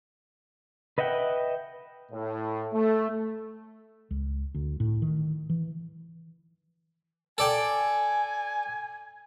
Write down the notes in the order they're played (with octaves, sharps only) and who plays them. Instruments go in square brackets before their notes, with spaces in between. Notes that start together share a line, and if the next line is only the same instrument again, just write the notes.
[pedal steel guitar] B4 D#5 E5 F#5 G5
[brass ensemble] A2
A3
[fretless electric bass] C#2
D2
A2
D#3
E3
[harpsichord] A4 D5 G5 [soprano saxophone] G#5